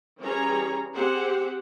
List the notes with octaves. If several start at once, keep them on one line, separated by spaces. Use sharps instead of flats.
E3 G3 C#4 G#4 C#5 A#5
C4 G4 G#4 C5 F#5